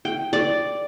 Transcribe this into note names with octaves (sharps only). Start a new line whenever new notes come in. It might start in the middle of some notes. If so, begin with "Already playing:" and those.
G5
D5